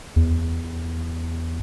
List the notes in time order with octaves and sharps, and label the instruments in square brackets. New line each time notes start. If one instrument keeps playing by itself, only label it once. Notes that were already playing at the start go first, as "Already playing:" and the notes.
[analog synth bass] E2